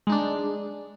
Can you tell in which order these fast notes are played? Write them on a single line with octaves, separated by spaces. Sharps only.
G#3 D#4 D4